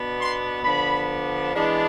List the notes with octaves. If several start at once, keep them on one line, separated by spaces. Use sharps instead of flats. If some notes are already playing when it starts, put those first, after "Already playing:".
Already playing: B2 B3 D4
C6
D3 F3 B3 D4 B5
E3 G#3 B3 D4